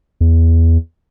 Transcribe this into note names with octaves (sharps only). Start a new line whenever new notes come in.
E2